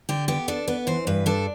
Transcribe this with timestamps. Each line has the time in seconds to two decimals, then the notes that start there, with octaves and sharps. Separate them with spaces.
0.09 D3 G4
0.28 B3 G4
0.48 D4 A4
0.68 B3 B4
0.87 E3 C5
1.07 G2 B4
1.26 D4 A4